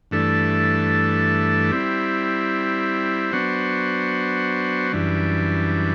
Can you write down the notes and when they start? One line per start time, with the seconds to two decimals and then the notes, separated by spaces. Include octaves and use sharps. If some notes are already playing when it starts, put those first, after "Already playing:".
0.11 G2 E3 A3 D4 A4
1.71 G3 C4 E4
3.32 F#3 B3 D4 F#4 C5
4.92 F#2 E3 G3 D4